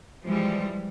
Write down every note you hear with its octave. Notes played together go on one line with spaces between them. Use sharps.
E3 F3 G3 G#3